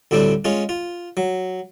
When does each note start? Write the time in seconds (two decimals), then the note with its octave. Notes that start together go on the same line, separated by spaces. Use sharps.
0.11 D2 A2 G3 C4 D4
0.45 G#3 C#4 F4
0.69 F4
1.17 F#3